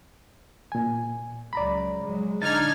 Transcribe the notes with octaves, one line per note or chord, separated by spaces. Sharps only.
A#2 G#5
C#2 F#3 D5 A#5 B5
F#3 G#3
D3 D4 D#4 F6 G#6 A6